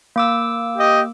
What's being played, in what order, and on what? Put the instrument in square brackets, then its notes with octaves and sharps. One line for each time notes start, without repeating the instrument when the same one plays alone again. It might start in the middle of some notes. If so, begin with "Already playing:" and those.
[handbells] A#3 D6 E6
[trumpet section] G4 D#5